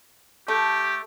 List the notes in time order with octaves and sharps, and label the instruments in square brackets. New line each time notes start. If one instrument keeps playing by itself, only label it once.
[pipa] A3 [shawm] G4